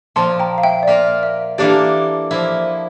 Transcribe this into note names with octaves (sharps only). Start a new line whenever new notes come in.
A#2 F3 A#3 A5 C6
G5 A#5
F5
E5 G5
D5
A#3 F4 A#4 E5
E5
E3 A#3 D4 G4 A4 D5
F3 A#3 E4